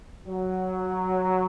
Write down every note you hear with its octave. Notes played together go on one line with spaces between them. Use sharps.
F#3